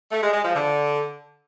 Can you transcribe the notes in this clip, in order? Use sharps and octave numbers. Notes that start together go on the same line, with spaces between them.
A3
G#3
G#3
F3
D3